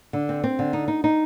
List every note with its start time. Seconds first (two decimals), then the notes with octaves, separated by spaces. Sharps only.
0.13 D3
0.29 C4
0.44 C4
0.59 D3
0.73 D#4
0.88 D#4
1.04 D#4